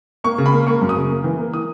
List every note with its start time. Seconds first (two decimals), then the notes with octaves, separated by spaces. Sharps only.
0.24 A#3 C#6
0.38 C#3
0.46 B5
0.52 A#3
0.67 A#3 C#6
0.81 F#2
0.89 D#6
0.96 C#3
1.10 A#3
1.24 E3
1.39 A#3
1.54 E3 D#6